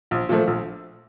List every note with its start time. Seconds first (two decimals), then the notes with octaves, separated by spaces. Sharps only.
0.11 A#1
0.29 A#2 F3 A3
0.47 A#1